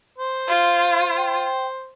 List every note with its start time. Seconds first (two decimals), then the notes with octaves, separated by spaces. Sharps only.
0.18 C5
0.48 F4 F5
1.17 G5